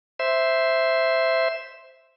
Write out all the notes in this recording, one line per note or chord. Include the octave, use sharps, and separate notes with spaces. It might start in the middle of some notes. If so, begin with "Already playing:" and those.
C5 E5